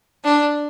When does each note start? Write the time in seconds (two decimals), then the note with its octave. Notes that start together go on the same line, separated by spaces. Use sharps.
0.24 D4